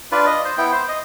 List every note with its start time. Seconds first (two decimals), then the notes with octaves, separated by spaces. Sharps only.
0.12 D4 F4 B4 D5
0.26 D#5
0.45 C5
0.58 B3 E4 G5
0.72 C5
0.89 D#5